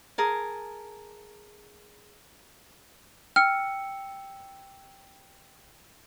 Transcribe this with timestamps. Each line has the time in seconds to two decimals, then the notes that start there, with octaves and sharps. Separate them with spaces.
0.18 G#4 A#4 A5
3.36 G5 E6 F6 C#7